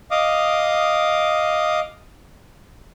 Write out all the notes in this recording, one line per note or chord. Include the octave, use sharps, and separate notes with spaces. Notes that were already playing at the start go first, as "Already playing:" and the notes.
D#5 F5 D6 D#6